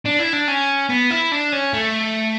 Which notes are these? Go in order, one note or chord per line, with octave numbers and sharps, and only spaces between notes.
D4
E4
D4
C#4
B3
E4
D4
C#4
A3